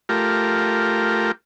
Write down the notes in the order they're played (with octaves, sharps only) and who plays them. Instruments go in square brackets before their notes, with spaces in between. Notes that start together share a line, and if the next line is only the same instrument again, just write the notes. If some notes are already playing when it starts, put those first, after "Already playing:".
[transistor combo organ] A3 F4 G4 A#4